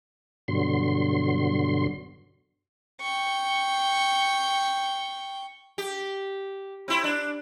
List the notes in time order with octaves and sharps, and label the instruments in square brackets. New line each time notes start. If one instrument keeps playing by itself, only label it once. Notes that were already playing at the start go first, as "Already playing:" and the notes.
[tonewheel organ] G2 B2 D3 F#3 C6
[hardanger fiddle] G5 C#6
[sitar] G4
C4 E4
D4